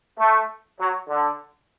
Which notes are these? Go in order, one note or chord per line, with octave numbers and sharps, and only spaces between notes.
A3
F#3
D3